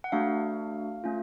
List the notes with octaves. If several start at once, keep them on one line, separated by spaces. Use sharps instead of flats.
F#5
A3 D4 F#4 F5
A3 C#4 F4